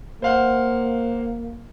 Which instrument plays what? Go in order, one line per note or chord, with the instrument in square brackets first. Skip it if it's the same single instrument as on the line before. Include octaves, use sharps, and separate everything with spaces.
[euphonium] A#3 [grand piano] C5 F5 F#5